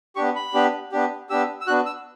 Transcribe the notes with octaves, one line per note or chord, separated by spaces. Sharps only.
B3 D4 G4 C#6
B5
B3 D4 G4
B3 D4 G4
B3 D4 G4 E6
E6
B3 D4 F#4 F#6
E6